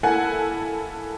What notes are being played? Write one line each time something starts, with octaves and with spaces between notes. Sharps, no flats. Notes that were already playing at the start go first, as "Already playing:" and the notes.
A#3 E4 A4 F#5 G#5